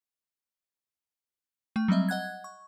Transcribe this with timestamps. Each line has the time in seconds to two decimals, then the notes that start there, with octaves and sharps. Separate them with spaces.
1.76 A3 G5
1.88 F#3 G3 C4 D#5 E5
2.09 D#5 F#5 F#6 G#6
2.44 C#6